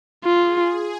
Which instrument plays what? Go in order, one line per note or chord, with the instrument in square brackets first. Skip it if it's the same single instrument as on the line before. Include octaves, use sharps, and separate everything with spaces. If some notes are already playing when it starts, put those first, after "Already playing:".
[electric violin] F4 [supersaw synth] G#4